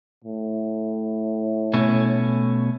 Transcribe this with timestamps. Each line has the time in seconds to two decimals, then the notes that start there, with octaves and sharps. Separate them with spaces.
0.24 A2
1.74 B2 A3 C#4